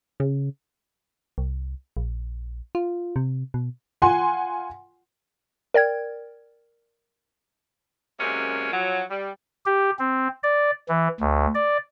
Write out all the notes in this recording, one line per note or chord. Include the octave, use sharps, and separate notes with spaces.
C#3
C2
A#1
F4
C3
B2
F4 F#5 G#5 C6
A#4 D5 G5 G#6
F#2 C3 G#3 A#3 C#4
F3 F#3
G3
G4
C4
D5
E3
D2
D5